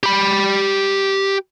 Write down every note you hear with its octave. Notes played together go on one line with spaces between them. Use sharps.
G4 B5